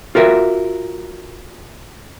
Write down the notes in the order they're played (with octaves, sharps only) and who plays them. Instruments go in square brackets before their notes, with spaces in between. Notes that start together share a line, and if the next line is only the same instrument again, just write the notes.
[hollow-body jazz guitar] F4 F#4 A#4 E5